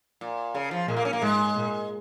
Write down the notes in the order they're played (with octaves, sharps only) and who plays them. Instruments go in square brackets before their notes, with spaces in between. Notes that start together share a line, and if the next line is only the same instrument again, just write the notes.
[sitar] A#2
C#3
F3
[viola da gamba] A#2 [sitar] G#3
[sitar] A#3
C#4
A#3
[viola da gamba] G#2 [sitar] G#3
[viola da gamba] A#2